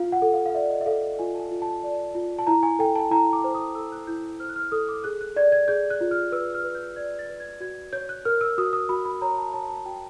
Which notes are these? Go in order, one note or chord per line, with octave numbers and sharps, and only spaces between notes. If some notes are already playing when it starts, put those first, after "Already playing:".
Already playing: F4 F5
F#5
A4
F5
F5
D5 E5
D#5
E5
A4 F5
F4 G#5
A5
G#5
F4
A5
D5
F4
A5
E4 A#5
G#5
A4 G5
A5
E4 A#5
D6
C5
D#6
A4 E6
F#6
E4 G6
C5 F6
F#6
F6
A4 D#6
D6
G#4 F#6
F#6
D5 G#6
G#6
G#4 G6
F#6
F4
F6
B4 E6
F6
B4
G6
D5 G#6
A6
B4
G#6
F#4 G#6
C#5 G6
F#6
A#4 F6
E6
F#4 D#6
D#6
F#4 B5
B5
C#5 A#5
A5
C#5 A5
A5
F#4 G5